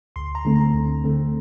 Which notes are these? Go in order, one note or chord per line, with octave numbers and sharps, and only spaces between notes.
D2 C6
A#5
D3 A3 C4
A#5
D2
D3 A3 C4